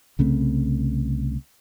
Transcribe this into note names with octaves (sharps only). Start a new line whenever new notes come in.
C2 C#3 A3 C4